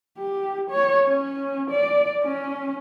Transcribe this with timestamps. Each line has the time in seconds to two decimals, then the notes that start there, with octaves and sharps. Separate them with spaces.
0.18 G4
0.71 C#5
1.06 C#4
1.71 D5
2.24 C#4